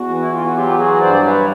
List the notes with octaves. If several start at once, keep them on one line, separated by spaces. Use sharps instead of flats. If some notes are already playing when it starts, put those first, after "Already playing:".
Already playing: E2 F#4
E3
E4
F4
F#4
F#3 F4 G4
F#4 G#4
G2 C5 D5
B4 C#5